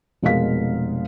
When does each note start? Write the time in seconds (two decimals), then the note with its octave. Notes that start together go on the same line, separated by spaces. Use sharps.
0.22 F1 B2 G#3 A#4 F5 B6